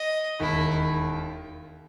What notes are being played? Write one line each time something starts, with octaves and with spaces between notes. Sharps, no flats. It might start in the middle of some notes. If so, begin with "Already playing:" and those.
Already playing: D#5
E1 D#2 D#3 E4